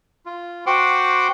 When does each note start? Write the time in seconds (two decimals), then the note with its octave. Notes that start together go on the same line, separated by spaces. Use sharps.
0.26 F4
0.66 F#4 C5 F#5 G5 C6 D6